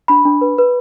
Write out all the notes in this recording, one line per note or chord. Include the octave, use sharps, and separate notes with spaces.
D4 B5
D4
B4
B4